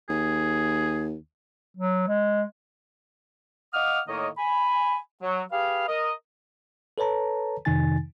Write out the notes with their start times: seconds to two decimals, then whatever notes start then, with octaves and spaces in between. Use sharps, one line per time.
0.09 D#2 G#4
1.77 F#3
2.08 G#3
3.74 D#5 F5 F#5 D6 D#6 F6
4.08 A2 D#3 A#3 C#5 D#5
4.38 G#5 B5
5.23 F#3
5.52 G4 G#4 B4 F5
5.88 A#4 D#5
6.98 A4 B4 C#5 A5 A#5
7.65 F2 C3 D#3 D#4 G#5 A6